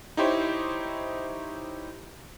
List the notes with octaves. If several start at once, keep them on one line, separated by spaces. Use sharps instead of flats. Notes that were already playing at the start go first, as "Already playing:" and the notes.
D#4 E4 G4 C5 C#5